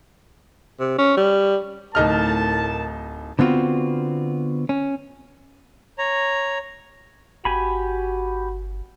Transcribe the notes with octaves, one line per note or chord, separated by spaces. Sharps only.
C3
C#4
G3
D1 A2 D#4 A#4 A5 F6
D3 B3 C4 F4 F#4
C#4
C#5 A#5
G1 F#4 G4 G#5 B5